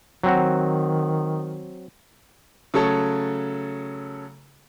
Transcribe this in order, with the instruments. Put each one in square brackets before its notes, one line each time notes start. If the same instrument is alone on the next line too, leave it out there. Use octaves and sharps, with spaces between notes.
[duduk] D#3 [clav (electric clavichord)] F#3 C4 F#4
[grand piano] C#3 F#3 A3 A4 C#5